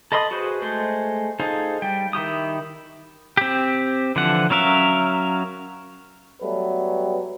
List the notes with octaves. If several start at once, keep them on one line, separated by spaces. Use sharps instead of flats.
A4 D#5 B5 C6 D#6
F#4 G#4 B4 C5
G#3 A3 C5
D#4 F4 G#4 A4 C5
G3 G5
D#3 E4 G4 D#6
C4 G4
D3 E3 F3 F#5
F#3 C#4 A#4 E5 F5
F#3 G3 A3 B3 A4 B4